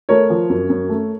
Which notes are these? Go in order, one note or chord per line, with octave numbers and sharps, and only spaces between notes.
A3 A#4 C#5
F3
F#2
F#2
A3